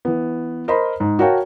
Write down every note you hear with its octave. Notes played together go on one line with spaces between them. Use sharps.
E3 B3
A#4 C5 D#5 B5 C6
G#2
F#4 A#4 C#5 F5 G5 A5